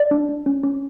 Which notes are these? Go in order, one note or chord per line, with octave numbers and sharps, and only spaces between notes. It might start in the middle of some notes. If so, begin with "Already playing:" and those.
Already playing: D5
D4
D4
C#4
C#4